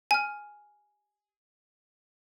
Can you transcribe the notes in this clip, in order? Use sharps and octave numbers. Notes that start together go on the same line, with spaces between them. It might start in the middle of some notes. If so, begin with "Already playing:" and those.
G#5 F6